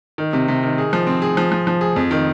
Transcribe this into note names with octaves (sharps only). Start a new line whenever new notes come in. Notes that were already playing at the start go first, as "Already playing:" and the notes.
D#3
C3
C3
D#3
G#4
F3
C4
G#4
F3
F3
F3
G#4
F2
D#3